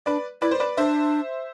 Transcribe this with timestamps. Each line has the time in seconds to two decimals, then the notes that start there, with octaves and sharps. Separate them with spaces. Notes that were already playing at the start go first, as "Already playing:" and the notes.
0.06 D4 B4 D5
0.42 E4 B4 D5
0.51 C5
0.60 B4 D5
0.77 D4 C5 E5